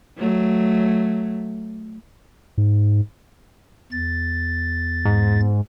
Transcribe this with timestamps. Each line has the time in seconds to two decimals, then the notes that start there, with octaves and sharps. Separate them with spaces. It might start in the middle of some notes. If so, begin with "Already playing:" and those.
0.18 F#3 A3
2.58 G#2
3.92 E2 A6
5.05 G#2